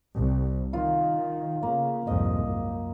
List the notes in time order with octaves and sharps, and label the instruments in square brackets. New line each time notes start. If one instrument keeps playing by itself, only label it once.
[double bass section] C2
[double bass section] D#3 [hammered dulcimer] F4
[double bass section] C#3 [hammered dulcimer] A#3
[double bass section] C2 F2 G#2 [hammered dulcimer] D#5
[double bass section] F#2